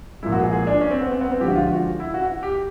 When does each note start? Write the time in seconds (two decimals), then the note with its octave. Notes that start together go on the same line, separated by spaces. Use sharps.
0.23 A#2 F3 G#3 E4
0.32 F#4
0.42 G#4
0.53 G#4
0.67 D4
0.81 C#4
0.91 C4
1.01 B3
1.11 C4
1.21 B3
1.31 C4
1.40 D3 F3 G#3 G4
1.48 F#4
1.55 F4
1.63 F#4
2.00 E4
2.14 F#4
2.43 G4